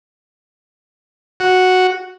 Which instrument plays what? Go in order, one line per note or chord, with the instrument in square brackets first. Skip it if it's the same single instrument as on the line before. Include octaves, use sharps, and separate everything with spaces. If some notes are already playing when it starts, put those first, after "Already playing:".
[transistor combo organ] F#4